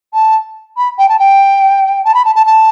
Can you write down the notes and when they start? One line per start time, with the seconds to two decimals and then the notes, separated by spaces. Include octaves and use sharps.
0.14 A5
0.77 B5
0.98 G5
1.09 A5
1.19 G5
2.04 A5
2.14 B5
2.25 A5
2.35 A5
2.46 A5